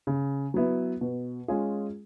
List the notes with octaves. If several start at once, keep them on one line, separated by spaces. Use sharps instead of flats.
C#3
F#3 B3 E4
B2
G#3 C#4 F4 G#4